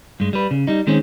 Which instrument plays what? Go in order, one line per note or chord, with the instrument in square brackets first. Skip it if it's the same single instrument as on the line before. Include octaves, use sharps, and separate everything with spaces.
[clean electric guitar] G2 G#3
G3 B4
C#3
G3 D#4
D#3 G#3 C4 C#4